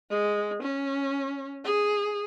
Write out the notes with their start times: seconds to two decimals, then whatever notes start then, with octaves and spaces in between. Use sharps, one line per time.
0.10 G#3
0.63 C#4
1.64 G#4